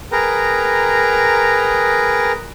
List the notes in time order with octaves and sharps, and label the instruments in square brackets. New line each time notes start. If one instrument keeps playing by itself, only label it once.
[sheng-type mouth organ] G#4 A#4 B4 G5 A#5